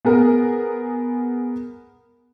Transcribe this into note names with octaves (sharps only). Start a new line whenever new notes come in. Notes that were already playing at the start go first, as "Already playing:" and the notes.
B3 G#4 A#4